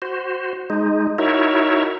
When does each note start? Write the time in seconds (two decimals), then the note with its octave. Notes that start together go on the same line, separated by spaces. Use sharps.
0.02 F#4 C5
0.70 G#3 D#4
1.18 D#4 E4 F#4 A#4 C#5 E5